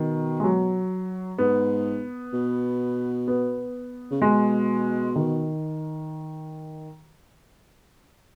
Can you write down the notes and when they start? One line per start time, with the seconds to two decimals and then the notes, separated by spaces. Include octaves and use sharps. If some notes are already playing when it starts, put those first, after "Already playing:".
Already playing: B2 D#3
0.40 G#3
0.44 F#3
1.38 G#2 B3
2.33 B2
3.27 B3
4.11 C#3
4.21 B2 G#3
5.16 D#3